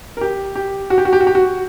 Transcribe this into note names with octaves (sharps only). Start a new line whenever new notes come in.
A#4
G4
G4
F#4
G4
F#4
G4
F#4
G4
F#4